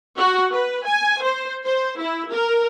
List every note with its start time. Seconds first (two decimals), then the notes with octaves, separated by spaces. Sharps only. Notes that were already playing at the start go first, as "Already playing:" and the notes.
0.18 F#4
0.52 B4
0.87 G#5
1.22 C5
1.65 C5
2.00 E4
2.31 A#4